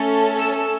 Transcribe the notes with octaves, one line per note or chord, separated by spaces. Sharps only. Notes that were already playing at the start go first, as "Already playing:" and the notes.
Already playing: A3 C#4 A4
E6